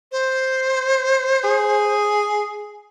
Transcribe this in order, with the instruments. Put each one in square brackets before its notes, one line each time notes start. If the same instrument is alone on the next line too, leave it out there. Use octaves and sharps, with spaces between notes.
[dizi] C5
[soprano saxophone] G#4